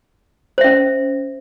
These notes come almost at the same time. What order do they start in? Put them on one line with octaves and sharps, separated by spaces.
C5 E5 C#4